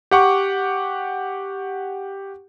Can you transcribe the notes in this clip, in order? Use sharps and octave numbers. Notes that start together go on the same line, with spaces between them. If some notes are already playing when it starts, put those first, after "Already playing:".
G4 F#5 C#6 D6